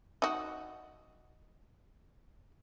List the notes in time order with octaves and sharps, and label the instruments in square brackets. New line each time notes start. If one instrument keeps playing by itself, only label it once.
[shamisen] D#4 F#4